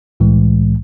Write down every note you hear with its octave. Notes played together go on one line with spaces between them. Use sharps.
C2 A2 E3 G#3